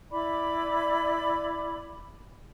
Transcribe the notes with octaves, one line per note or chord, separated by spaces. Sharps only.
E4 D5 B5 D6